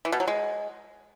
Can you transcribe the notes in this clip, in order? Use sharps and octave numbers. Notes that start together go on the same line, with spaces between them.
E3
B2
F#3
G#3